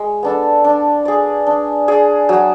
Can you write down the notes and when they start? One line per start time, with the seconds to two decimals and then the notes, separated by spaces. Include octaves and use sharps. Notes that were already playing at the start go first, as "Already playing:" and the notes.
Already playing: G#3
0.23 B3 D4 A4
0.64 D4
1.05 G#4 D5
1.47 D4
1.88 G#4 D5
2.29 F#3